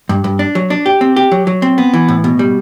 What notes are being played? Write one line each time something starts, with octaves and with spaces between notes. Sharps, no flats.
G2
G2
D4
F#3
D4
G4
C4
G4
F#3
F#3
C4
B3
E3
A2
B2
G3